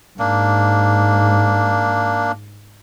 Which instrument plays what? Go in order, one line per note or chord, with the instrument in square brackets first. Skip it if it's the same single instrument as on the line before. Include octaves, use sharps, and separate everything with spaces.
[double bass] G#2 [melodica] A#3 D4